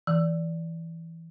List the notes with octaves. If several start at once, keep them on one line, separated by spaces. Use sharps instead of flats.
E3